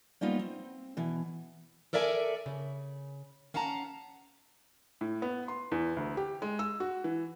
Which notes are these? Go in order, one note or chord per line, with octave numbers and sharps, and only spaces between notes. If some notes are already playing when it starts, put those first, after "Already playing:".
G3 A#3 B3 C#4 D#4 F4
C4
B2 E3
A4 A#4 D5 E5 F5 G#5
C#3
C#4 F5 F#5 A5 A#5
A2
B3
C6
E2
D2
G4
G#3
E6
F#4
E3